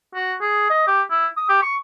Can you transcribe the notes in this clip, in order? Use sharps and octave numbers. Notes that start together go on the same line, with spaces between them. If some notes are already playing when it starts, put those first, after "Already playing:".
F#4
G#4
D#5
G4
E4
D#6
G4
C#6